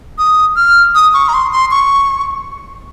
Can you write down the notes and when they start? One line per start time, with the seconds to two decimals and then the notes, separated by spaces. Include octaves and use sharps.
0.18 D#6
0.56 F6
0.95 D#6
1.14 C#6
1.28 A#5
1.34 C6
1.52 C6
1.71 C#6